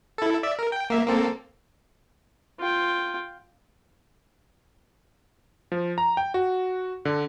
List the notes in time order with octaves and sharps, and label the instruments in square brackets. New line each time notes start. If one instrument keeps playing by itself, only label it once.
[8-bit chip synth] E4 A4
D5 E5 E6
A#4
G5
A#3 E5
A#3 C4 A4
[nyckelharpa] F4 G5
[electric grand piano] F3
A#5
G5
F#4
D3